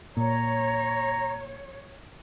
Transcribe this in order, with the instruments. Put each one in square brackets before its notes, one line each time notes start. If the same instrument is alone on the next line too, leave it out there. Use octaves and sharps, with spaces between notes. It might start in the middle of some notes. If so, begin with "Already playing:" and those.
[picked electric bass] A#2 [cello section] C#5 [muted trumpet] A#5